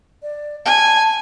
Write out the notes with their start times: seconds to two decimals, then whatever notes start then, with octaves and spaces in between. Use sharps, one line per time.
0.22 D5
0.66 G#5 A5